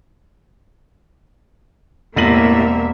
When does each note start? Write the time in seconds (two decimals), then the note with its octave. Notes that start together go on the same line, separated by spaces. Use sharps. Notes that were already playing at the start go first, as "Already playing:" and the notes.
2.16 E1 A2 C3 A#3 E5 D#7 F#7